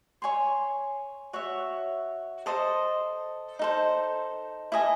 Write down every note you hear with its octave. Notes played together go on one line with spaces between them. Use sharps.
C#5 G#5 C6
F#4 C#5 E5
A4 C5 D#5 A5
D#4 A4 C5
E4 A4 D#5 G#5